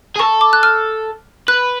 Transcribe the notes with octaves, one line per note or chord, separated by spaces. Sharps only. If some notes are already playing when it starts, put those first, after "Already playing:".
G#4
A4 C#6
D6
F#6
F6
B4 F#6